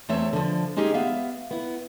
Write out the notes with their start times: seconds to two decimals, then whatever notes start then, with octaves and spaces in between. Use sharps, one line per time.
0.09 E2 A3 C4 C#5 E5
0.33 D3 F3
0.77 G#3 C#4 D#4 G4 G#4
0.94 B3 E5 F5
1.51 B3 E4